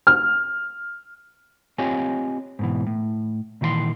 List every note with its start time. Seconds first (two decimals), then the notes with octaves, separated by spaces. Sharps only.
0.07 F6
1.78 C4 F4 G4 C#5 D#5 G#5
2.59 G#2 B2 E3
2.87 A2
3.61 A#2 D#3 E3 F#4 C6